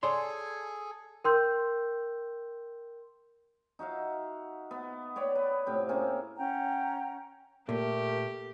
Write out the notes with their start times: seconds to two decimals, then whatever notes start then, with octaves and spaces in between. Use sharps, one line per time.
0.03 G#4 A4 C#5 D5 G#5 C6
1.24 A#4 G5 C6 E6 G6
3.79 D#4 F#4 E5 F5
4.71 B3
5.16 B3 C#5 D5 G5
5.35 B4
5.66 A2 C3 G5
5.89 A#3 C4 C#4 G#4
6.37 C#4 F#5 G5 A#5
7.69 A#2 A3 G4 A#4